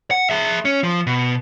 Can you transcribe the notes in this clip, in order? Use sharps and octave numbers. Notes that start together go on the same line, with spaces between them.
F#5
G#4 E5
C#4
F3
B2